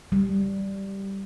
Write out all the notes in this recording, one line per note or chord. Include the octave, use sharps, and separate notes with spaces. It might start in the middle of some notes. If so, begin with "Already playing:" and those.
G3